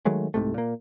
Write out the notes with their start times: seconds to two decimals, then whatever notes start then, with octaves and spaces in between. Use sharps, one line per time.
0.05 D#3 F#3 G#3 A3
0.34 C2 G#2 C3 A3
0.54 A#2 A#3